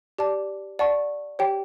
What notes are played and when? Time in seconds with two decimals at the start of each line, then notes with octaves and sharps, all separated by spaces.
0.18 G4 D5 A5 D6
0.79 D5 F#5 A5 C#6
1.39 G4 C#5 G5